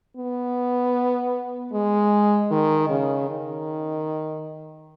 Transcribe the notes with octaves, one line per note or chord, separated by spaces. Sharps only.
B3
G#3
D#3
C#3
D#3